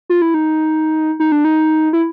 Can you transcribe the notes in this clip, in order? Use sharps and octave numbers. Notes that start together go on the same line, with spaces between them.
F4
E4
D#4
D#4
D4
D#4
E4